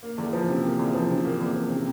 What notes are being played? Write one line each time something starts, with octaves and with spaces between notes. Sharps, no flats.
A#3
E2
F3
C3
A#3
E2
F3
C3
A#3
E2
F3
C3